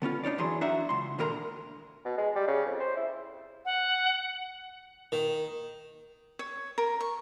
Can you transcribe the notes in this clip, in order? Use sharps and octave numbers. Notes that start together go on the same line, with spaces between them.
D3 B3 C#4 F4
D4 D#4 C#5 D5
F#2 E3 F#3 G#4 C6
D4 D#4 F#4 E5
C#2 C6
D#2 A#2 D3 A#4 A#5 C6
B2
G#3
G3
C#3
F2
C5
E4
F#5
D#3
C#5
A#4
C#6